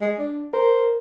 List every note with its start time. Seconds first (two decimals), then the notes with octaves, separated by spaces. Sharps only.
0.01 G#3
0.19 D4
0.53 A#4 C5